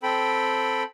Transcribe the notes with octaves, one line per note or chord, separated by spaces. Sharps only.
C4 A4 G5 B5